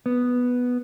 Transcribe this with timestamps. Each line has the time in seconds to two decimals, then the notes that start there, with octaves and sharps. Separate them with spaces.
0.06 B3